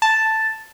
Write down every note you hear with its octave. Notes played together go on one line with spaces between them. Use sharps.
A5